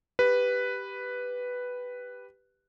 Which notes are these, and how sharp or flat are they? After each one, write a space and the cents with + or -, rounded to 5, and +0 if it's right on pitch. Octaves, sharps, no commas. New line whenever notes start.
G4 +0 B4 +0